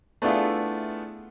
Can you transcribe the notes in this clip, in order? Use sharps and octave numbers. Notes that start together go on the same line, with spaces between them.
A3 B3 D4 E4 F4 G#4